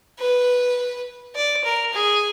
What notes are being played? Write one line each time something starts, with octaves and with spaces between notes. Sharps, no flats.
B4
D5
A#4
G#4